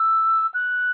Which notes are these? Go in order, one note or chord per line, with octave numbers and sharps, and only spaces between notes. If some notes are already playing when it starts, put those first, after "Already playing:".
Already playing: E6
F#6